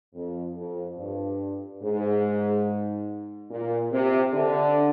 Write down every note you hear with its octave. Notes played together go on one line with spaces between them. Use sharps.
F2
F2
G2
G#2
A#2
C3
D3